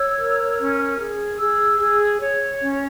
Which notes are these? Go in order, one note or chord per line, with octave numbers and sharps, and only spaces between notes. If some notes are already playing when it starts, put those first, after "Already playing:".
Already playing: C#5 E6
A#4
C#4
G#4
G#4 E6
G#4
C#5
C#4